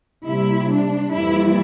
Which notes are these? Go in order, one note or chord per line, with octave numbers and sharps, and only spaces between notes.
C3 G3 A#3 E4
D4
F2 E3 G3 A#3 E4